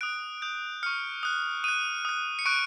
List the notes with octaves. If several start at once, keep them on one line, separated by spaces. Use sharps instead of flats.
D#6 F#6 D7
D#6 G6
C#6 F6 C#7
D#6 F#6
D#6 F#6 D#7
D#6 F#6
C#7
C#6 F#6 D7